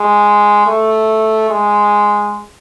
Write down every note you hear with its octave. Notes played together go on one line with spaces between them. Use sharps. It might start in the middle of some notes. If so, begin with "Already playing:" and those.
Already playing: G#3
A3
G#3